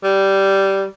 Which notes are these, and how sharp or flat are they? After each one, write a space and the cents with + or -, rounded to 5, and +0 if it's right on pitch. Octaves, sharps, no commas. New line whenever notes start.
G3 -10